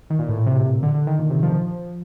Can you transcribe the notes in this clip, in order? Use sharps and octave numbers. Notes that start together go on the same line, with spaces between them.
D#3
A#2
A2
A#2
C3
D3
D3
D#3
A#2
C3
F3
F3